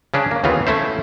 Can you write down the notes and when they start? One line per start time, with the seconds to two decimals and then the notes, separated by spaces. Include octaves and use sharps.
0.14 C#3 C#4 D4
0.31 A#3
0.44 D#2 C#3 E3 B3 F4
0.67 A3 C#4 E4 C5